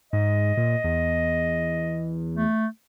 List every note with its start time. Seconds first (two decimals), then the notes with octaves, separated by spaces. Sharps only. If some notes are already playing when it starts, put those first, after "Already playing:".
0.13 G#2 D#5
0.57 A#2
0.84 E2
2.35 A3